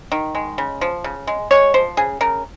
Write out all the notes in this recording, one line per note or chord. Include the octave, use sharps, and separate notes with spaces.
D#3
G#3
C#3
F3
C#3
G#3
G#3 C#5
F3 C5
C#3 G#4
C#3 A#4